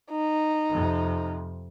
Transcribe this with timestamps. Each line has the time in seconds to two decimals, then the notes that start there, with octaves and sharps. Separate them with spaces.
0.11 D#4
0.70 F2 C3